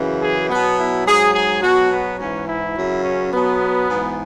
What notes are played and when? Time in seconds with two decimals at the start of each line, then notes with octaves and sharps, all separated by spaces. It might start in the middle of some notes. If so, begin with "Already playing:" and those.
Already playing: F#2 C#3 E3
0.21 G#4
0.49 B2 F#3 B3
0.78 E4
1.05 G#2 F#3 G#4
1.34 G#4
1.62 B2 F#3 F#4
1.91 B3
2.19 G#2 E3 C#4
2.47 E4
2.75 F#2 C#3 F#3
3.03 C#4
3.32 B2 F#3 B3
3.88 G#2
3.93 E3